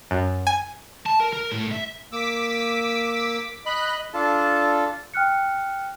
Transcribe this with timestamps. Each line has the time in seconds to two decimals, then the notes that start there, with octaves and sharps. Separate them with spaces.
0.11 F#2
0.47 G#5
1.06 A5
1.20 A#4
1.33 A#4
1.52 A2
1.71 E5
2.12 A#3 D6 E6 B6
3.66 D#5 B5 F#6
4.14 D4 F4 A4 A5
5.14 G5 F6 F#6 C#7